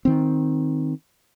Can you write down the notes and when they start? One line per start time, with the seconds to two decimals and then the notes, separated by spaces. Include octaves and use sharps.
0.05 D#3 C4